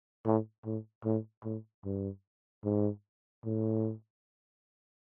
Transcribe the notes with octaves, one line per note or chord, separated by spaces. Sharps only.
A2
A2
A2
A2
G2
G#2
A2